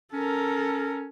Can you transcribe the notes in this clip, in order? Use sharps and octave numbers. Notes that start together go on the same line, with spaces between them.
C#4 A4 A#4